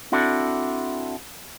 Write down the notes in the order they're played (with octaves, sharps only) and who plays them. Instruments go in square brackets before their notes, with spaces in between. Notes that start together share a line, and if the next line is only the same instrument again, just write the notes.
[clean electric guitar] C4 D4 E4 F#4 A4